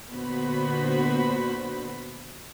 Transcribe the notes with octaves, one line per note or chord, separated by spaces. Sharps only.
A#2 D3 B3 F#4 C5 B5